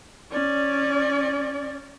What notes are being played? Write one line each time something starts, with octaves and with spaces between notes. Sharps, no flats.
C#4 D5